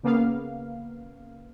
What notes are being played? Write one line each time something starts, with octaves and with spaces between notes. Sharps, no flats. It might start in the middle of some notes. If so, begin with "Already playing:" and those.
C#3 A#3 B3 F5